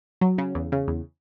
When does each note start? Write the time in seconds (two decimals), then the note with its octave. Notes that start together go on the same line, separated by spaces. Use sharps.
0.21 F#3
0.38 C#3
0.55 E2
0.72 C#3
0.88 E2